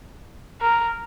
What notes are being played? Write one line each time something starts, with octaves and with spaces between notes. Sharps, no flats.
A#4